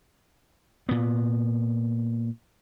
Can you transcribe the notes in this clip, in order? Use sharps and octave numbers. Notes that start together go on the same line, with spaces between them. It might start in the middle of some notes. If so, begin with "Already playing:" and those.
A#2 B3